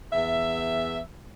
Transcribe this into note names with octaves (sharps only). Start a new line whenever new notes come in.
E2 E5